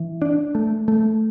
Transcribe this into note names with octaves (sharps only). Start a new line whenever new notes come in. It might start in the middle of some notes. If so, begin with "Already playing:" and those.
Already playing: E3
D4
A3
A3